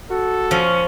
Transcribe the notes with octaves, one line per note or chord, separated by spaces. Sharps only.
F#4 A4
A#2 F3 C#4